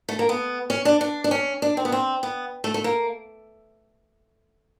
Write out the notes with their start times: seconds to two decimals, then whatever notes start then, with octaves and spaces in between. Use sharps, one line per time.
0.09 A3
0.19 A#3
0.29 B3
0.70 C#4
0.85 D4
1.01 D4
1.24 D4
1.31 C#4
1.62 D4
1.77 C4
1.85 B3
1.92 C4
2.23 B3
2.64 A3
2.74 A3
2.84 A#3